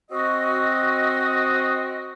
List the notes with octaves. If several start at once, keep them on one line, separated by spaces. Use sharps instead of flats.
C4 F#4 D#5